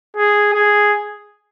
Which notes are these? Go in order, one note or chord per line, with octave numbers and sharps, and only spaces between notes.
G#4
G#4